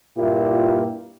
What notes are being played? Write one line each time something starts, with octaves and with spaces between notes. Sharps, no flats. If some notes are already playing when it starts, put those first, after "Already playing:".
G2 A#2 A#3 E4 F4 G4